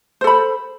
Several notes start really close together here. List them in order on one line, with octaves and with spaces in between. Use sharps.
C5 A4 B5